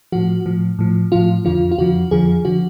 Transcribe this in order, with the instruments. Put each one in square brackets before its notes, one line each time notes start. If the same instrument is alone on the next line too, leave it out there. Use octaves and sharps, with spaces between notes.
[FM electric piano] A2 F3 F#4
A2 F3
A2 F3
A2 F3 F4
F2 D3 F3 F4
F4
F2 D3 F3 F#4
F2 D3 F3 G#4
D3 F3 F#4